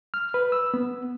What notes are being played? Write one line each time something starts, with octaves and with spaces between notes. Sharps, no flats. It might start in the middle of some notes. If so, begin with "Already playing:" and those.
F6
B4
E6
B3